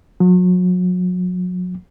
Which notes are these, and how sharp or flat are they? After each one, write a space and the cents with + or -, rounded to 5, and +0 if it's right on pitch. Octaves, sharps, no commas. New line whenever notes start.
F#3 -35